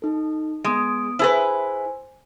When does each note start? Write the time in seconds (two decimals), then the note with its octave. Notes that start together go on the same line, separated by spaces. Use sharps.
0.02 D#4 A4
0.64 G#3 B3 D#6 D7
1.19 E4 G#4 B4 C5 G#5